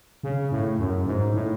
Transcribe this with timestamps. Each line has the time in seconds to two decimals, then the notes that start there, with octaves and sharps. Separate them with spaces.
0.23 C#3
0.52 A2
0.79 F#2
1.07 G#2
1.34 A2